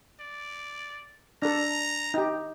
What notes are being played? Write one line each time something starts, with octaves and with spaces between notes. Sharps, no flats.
D5
D4 A4 A#5
D#4 G4